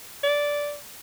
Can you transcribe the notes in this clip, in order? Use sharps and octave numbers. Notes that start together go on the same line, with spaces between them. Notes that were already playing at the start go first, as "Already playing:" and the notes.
D5